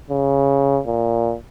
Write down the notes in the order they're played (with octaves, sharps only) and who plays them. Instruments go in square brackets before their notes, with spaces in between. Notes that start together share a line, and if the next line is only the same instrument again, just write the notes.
[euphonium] C#3
A#2